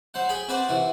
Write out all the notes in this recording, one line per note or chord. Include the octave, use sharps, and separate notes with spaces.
F#3 C5 F#5
G#4 G5 G#5 B5
C4 F#4 B4 C5 D5
C3 E3 F#4